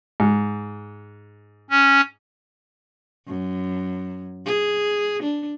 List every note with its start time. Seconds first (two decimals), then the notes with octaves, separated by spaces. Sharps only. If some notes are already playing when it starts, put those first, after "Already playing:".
0.20 G#2
1.70 C#4
3.28 F#2
4.46 G#4
5.23 D4